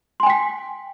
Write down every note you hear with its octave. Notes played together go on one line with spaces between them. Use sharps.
G5 G#5 C6 B6